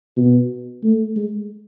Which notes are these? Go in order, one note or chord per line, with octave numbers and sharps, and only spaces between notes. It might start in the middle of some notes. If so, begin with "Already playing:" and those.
B2
A3
G#3